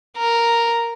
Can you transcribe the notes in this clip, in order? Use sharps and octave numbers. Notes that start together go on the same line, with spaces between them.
A#4